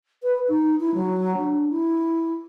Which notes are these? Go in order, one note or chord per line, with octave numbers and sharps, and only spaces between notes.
B4
D#4
E4
F#3
D4
E4